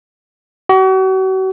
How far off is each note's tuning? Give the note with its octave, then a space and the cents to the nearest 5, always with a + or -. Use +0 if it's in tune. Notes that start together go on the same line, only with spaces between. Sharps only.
F#4 +40